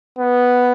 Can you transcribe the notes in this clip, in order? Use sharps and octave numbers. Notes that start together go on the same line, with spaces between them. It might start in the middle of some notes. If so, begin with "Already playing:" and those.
B3